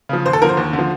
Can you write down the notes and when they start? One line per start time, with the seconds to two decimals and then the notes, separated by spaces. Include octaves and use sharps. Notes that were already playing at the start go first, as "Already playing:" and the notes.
0.09 C#3 F3
0.26 D#2 C5
0.33 A4
0.42 D3 F3 A#4
0.49 C5
0.57 D#2
0.73 D3
0.79 F3